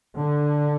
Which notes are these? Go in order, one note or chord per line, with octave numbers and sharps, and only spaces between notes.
D3